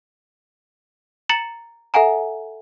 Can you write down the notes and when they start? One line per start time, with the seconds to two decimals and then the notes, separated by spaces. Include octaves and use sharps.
1.29 A#5 A6 C#7 E7 F#7
1.94 A4 E5 F#5 G#5 A#5